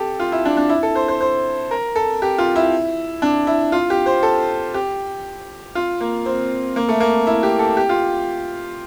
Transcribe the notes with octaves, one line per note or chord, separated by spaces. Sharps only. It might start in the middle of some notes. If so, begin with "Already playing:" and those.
Already playing: G4 A4
F4
E4
D4
D4
E4
A4
C5
C5
C5
A#4
A4
G4
F4
E4
D4
E4
F4
G4
C5
A4
G4
F4
A#3
C4
A#3
A3
A#3
E4
G4
A4
G4
F4